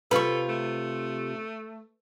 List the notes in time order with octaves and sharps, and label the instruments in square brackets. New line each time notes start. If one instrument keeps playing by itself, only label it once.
[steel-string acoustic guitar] C3 F4 [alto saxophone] A4 [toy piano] B4 [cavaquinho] B5 C#6
[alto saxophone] A3